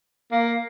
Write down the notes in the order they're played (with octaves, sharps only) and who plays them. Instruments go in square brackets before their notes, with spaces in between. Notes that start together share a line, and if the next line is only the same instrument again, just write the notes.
[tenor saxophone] A#3